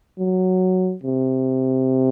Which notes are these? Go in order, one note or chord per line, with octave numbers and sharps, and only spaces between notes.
F#3
C3